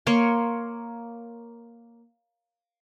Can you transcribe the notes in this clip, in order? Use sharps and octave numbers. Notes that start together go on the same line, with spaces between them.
A#3 C#5 C6